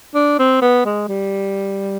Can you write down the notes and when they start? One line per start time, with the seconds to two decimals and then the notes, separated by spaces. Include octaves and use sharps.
0.15 D4
0.39 C4
0.62 B3
0.85 G#3
1.09 G3